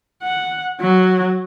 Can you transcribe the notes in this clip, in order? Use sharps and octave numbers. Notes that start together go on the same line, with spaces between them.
F#5
F#3